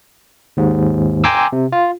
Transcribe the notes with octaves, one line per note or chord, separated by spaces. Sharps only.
D#2 G#2
G5 G#5 A#5 C6 D6 E6
C3
F4